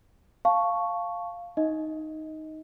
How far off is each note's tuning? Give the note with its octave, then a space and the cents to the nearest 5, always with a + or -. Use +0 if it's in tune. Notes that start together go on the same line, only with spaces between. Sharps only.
F5 +0 A5 +0 C#6 +0
D#4 +0 D#5 +20